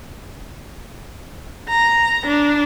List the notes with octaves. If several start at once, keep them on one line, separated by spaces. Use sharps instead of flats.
A#5
D4